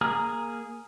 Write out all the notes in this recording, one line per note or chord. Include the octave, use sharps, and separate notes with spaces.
A#3 G#4 A#5 D#6 F6